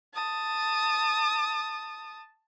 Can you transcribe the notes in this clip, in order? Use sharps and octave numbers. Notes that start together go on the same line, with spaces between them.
A5 D#6